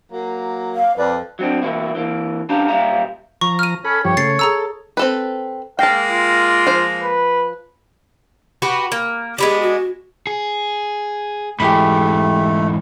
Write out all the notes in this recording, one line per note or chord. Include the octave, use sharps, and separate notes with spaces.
F#3 A#3
F5
F2 B4 D5
F#3 C4 D4
B2 E3 A#3 E4
E3 A#3
C#4 D4 G4 F5 A5 A#5
A#2 G3 G4 E5 F5 A#5
F3 A#5 C#6
F6 D#7
C#4 A4 B5
G2 F3 G4 C#5
C#3 A3 A6 C7
G#4 A4 A#5 E6
C4 A4 B4
G#3 A#3 F5 G5 A5
F4
F3 C5
B4
F#4 G4 B4
A#3
G#3 B3 D4 G4
F#4
G#4
G#2 E3 A3 G4 G#4 B5